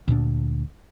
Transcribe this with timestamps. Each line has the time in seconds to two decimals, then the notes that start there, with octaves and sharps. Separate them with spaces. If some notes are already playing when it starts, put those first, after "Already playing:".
0.08 D2 A#2 B3 D4